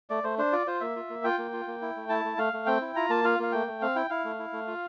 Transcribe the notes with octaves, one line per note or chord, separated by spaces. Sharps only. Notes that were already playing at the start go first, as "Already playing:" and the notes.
A3 D5
A3 C5
D4 C5
F4 D5
F4 C5
A#3 E5
F4
A#3
F4 G5
A#3
F4
A#3
E4
A3
E4 A5
A3
A3 F5
A3
C4 G5
E4
F4 A#5
A#3 A5
F4 F5
A#3 F5
A3 G5
A3
C4 F5
E4 G5
E4 F5
A3
E4
A3
F4